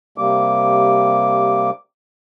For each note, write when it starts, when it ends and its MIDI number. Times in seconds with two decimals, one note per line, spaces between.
0.18 1.70 48
0.18 1.70 55
0.18 1.70 58
0.18 1.70 86